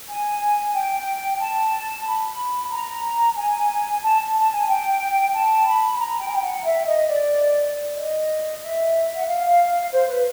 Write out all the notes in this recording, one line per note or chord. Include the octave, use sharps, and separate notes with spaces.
G#5
G5
A5
B5
A#5
G#5
A5
A5
G#5
G5
A5
B5
A#5
G5
G#5
G5
F#5
E5
D#5
D5
D#5
E5
F#5
F5
C5
B4